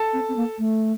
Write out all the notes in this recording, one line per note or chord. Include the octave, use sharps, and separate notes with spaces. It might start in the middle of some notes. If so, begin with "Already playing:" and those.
Already playing: A4 A5
C4
C4
A#3
A3